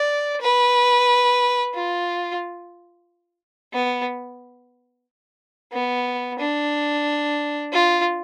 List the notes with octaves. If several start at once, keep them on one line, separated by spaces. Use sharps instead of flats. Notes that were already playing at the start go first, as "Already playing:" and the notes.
Already playing: D5
B4
F4
B3
B3
D4
F4